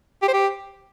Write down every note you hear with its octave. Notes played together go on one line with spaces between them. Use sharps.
G4
C5
G4